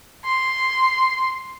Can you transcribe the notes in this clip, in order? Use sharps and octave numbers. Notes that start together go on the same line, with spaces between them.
C6